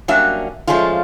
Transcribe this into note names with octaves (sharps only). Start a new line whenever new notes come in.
F#3 G3 A#3 C#4 D4 E5
F3 G#3 A3 C#4 F4